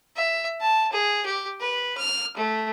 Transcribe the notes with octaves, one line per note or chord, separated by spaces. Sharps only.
E5
A5
G#4
G4
B4
F6
A3